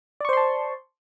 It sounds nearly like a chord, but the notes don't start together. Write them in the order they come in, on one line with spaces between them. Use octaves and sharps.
D5 C#6 C5 C6 A5